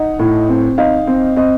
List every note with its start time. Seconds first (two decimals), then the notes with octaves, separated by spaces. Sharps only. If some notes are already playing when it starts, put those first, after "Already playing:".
Already playing: D#4 F#5
0.19 A2
0.49 C4
0.78 D#4 F5
1.07 C4
1.36 C4 D#5